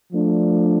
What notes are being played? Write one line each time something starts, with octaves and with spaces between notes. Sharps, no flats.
F3 A3 D4